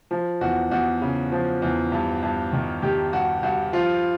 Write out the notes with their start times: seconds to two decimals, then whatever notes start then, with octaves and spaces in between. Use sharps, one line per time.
0.11 F3
0.41 E2 F#4
0.71 E2 F#4
1.02 C#3
1.32 F3
1.62 E2
1.92 G2
2.22 G2
2.53 D#3
2.82 D#3 G4
3.12 G2 F#4
3.43 G2 F#4
3.73 F3 F4